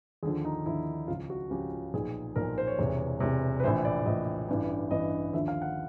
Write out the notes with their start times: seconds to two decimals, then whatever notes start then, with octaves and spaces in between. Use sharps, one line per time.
0.23 D#2 D3 F3 G#4
0.45 D#4
0.66 D#2 D3 F3 E4
1.08 C#2 C#3 F3 F4
1.30 F#4
1.50 C#2 C#3 F3 G4
1.94 B1 A#2 F3 G#4
2.36 B1 A#2 F3 A#4
2.58 C5
2.67 C#5
2.79 E1 E2 C3
3.20 E1 E2 C3
3.60 B4
3.64 A#1 A2 E3 C5
3.85 D5
4.06 A#1 A2 E3 D#5
4.48 A1 G2 E3
4.91 A1 G2 E3 D#5
5.33 D#2 D3 F3 E5
5.48 F5
5.62 F#5